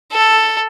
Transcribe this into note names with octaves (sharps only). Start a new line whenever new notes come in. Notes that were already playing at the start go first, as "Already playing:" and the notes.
A4